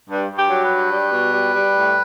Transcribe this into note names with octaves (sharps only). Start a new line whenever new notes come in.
G2
G2
G4
F#3
B4
G2
G3
B2
G3
G3
A2